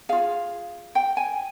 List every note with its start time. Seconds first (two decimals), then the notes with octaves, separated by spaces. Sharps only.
0.09 F4 G#4 F5
0.95 G5
1.17 G#5